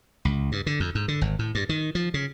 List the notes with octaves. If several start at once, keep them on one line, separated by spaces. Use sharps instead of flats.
C#2
G2
D3
F2
G#2
D3
G#1
A2
G2
D#3
F3
C#3